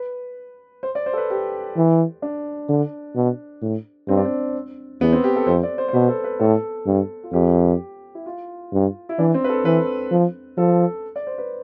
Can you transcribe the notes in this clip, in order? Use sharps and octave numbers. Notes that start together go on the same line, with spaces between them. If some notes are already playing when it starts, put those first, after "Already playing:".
Already playing: B4
C5
D5
C5
A4
B4
G4
E3
D4
D3
B2
A2
G2 C4
D4
C4
E2 B3
C4
G4
A4
F2 C5
D5
C5
C5
B2 B4
A4
B4
A2 A4
G2
F4
F2 G4
E4
F4
G2
E4
E3 D4
C4
B4
A4
E3 B4
F3
F3 A4
D5
C5
B4